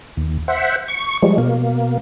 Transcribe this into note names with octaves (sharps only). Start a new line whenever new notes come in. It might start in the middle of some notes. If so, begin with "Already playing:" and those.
D#2
C5 E5 F#5
C#6
F3 G3 G#3
B2 A#3